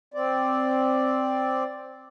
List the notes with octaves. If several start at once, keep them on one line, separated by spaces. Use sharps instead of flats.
C4 D5